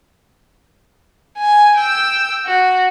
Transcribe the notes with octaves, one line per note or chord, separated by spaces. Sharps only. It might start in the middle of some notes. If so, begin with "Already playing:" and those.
G#5
G5 E6
F#4